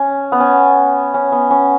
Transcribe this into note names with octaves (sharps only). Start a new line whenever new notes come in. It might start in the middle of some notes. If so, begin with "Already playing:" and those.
Already playing: C#4
B3
C#4
C#4
B3
C#4